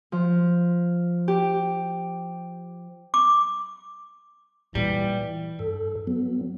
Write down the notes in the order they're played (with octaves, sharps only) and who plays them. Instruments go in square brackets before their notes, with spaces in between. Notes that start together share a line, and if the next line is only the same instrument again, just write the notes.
[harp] F3
G4
[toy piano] D6
[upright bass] A#2 [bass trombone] E3 [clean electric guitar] G3
[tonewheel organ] G2 A4
F#3 B3